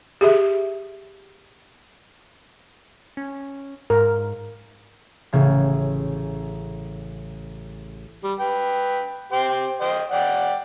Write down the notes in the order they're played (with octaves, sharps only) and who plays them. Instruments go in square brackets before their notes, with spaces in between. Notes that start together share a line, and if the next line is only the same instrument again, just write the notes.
[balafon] G4 G#4 E5
[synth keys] C#4
[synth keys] G#2 [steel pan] A#4
[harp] A1 C#3 G#6
[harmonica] G3
B4 G5
G4 C5 G5
C5 D#5 G5
D5 F#5 G5